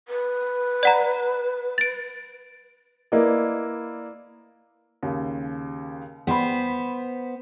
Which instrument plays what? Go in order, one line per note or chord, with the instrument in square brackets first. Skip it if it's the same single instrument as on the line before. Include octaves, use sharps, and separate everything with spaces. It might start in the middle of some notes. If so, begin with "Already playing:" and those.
[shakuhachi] B4
[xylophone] D5 F#5 A#5
A6 D7
[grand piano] A#3 E4 B4 D5 D#5
[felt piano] D#2 C#3
[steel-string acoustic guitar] B3 C5 [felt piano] G5 B5